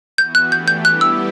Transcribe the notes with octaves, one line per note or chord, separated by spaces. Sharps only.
E3 B3 F#4 G6
F#6
E3 A3 D4 G4 G6
G6
G3 B3 E4 G4 F#6
E6